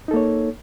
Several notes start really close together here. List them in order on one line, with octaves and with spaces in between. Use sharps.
D#4 A4 A#3 C#5